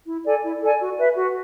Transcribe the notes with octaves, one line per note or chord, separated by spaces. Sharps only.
E4
A4 D5 G#5
E4
A4 D5 G#5
F#4
B4 E5
F#4